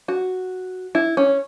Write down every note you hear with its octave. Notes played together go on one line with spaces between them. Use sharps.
F#4
E4
C#4